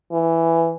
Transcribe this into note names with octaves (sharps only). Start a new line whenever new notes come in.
E3